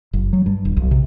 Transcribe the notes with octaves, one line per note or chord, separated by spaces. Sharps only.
F#1
F#3
G2
D#1
B1
C3